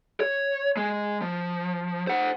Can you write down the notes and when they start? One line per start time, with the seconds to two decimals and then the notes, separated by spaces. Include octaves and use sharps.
0.20 C#5
0.77 G#3
1.21 F3
2.07 C5 F#5